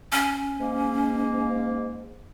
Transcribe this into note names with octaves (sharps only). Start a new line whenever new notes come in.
C#4
G#2 A#3